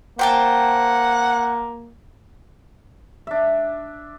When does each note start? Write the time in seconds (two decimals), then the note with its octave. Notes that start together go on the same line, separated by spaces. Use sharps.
0.19 A#3 C5 F#5 G5 A5
3.27 D4 E5